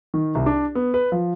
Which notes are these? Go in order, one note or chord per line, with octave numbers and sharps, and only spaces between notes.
D#3
C2
D4
B3
B4
F3